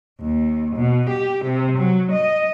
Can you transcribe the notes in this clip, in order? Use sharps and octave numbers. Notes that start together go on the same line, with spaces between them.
D#2
B2
G4
C3
F#3
D#5